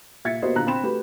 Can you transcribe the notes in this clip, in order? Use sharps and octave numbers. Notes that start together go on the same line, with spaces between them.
A#2 E5 G#6 A6 B6 C#7
A#3 B3 F#4 G4 C5 D#5
A#2 D3 A#5 F#6
C4 B5 C6 E7
A3 F#4 G4 B4